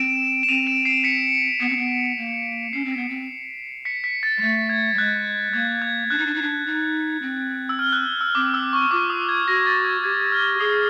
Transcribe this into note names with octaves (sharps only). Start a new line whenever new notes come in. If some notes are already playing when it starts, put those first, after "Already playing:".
Already playing: C4 D7 E7
E7
C4 D#7 F7
D7 E7
C7 D7
B6 C#7
B3
C4
B3
A#3
C#4 C7
C4
B3
C4
B6 C#7
B6
A6
G#3
A3 A6
G#6
G3
G#3 F#6
A#3 G#6
G#6
D4 F#6
D#4
D4
D#4
D4
D#4
C4
E6
F6
F#6
E6
C4 D6
E6
C#6
F4 D6
D#6
G#6
F#4 A#6
A6
G#6
G4 G#6
F6
G#4 D#6